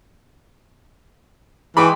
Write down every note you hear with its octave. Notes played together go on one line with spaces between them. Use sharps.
E3 G#3 G5 G#5 B5 C#6 D6